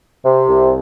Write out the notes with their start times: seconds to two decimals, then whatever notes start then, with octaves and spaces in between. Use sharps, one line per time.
0.25 C3
0.49 C2